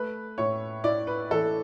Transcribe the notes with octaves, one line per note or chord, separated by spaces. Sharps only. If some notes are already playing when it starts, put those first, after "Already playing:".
Already playing: A3 B4
A2 C#5
E4 D5
B4
E3 A4